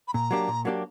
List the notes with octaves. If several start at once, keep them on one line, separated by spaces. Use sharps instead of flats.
B5
A#2 A#5
F#3 A#3 D4 G4
A#2
F#3 A#3 D4 G4